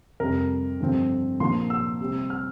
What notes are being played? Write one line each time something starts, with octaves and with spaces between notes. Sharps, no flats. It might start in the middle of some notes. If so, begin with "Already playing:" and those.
F2 C3 G3 A#4
G2 D3 F3 C4
A#2 F3 A#3 D4 C6
E6
C3 G3 C4
F6